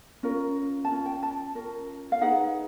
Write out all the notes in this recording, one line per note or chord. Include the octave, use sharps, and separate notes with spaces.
C#4 F4 A#4
A5
C#4 F4
G5
A5
C#4 F4 A#4
F5
D#4 G#4 B4 F#5